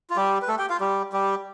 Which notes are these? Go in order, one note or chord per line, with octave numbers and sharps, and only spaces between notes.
F4
G3 G4
B4
A3 A4
G4 G5
F4 F5
G3 G4
G3 G4